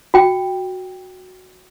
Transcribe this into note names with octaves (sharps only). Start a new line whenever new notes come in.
F#4 G5